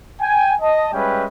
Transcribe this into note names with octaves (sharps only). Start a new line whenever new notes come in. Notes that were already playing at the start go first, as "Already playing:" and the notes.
G5 G#5
D#5 A5
G3 G#3 C#4 B4 E5 G5